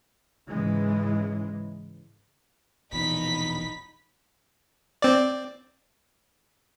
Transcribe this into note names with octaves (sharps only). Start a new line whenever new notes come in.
G#2 C#3 E3 G#3
E1 A#1 E2 D#4 B5 B6
C4 D5